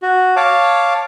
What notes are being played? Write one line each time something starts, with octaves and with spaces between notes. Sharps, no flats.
F#4
C#5 F5 A5 D6